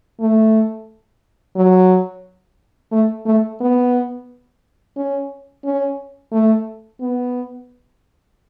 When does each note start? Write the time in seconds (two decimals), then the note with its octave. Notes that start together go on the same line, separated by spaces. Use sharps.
0.20 A3
1.56 F#3
2.92 A3
3.26 A3
3.61 B3
4.97 C#4
5.65 C#4
6.32 A3
7.01 B3